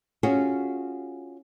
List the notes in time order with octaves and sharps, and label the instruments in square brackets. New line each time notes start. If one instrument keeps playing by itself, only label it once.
[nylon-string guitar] C#4 F4 F#4 G#4